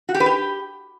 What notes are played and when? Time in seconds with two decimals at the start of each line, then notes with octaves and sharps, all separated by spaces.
0.09 F#4
0.14 G4
0.20 B4
0.26 G4